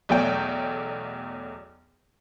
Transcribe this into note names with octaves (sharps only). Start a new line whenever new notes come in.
B1 E2 F#3 A3 D5 G5